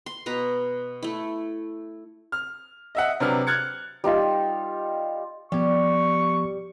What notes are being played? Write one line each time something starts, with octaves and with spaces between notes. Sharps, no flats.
C6
B2 B4 A#5
A3 E4
F6
D#5 E5 F#5
C3 F#3 D4 B4 F6
F6 F#6 G#6 A6 C#7
G3 D#4 F4 E6
F3 G3 B3 C#6